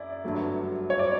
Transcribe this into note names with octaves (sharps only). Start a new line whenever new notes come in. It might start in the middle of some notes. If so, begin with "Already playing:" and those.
Already playing: F#2 E4 D5
G1 G2 F#3 A3
C#5
D5